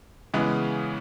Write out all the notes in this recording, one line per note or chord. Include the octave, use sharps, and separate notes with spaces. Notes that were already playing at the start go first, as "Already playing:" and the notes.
C#3 E3 G#3 B3